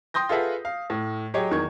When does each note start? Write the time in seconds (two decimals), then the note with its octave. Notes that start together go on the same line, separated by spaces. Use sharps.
0.14 G5 C6 D#6 G6 A#6
0.29 F4 G#4 A4 B4 E5 F#5
0.65 F5
0.90 A2
1.34 F#3 G4 G#4 C#5 D#5
1.51 E2 D#3 C#6 G#6